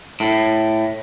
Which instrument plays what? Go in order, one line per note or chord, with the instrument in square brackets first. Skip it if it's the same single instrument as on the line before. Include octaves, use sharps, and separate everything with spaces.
[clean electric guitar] A2